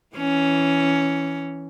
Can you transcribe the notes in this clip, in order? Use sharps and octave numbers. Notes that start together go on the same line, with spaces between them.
E3 C#4